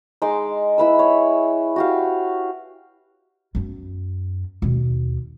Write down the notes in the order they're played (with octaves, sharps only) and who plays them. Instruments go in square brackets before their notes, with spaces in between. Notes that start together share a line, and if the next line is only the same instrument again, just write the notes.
[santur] G#3 D#4 C6 D6
E4 B4 E6
C#5
F#4 G4 F5
[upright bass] F#2 B3
D#2 B2